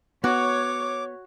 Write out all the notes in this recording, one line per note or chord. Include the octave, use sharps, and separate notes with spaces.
B3 F#4 C#5 D6